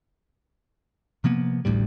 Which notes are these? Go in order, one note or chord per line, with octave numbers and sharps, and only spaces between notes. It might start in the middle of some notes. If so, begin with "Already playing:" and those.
C3 F3 A#3 B3
A1 D2 A2 G3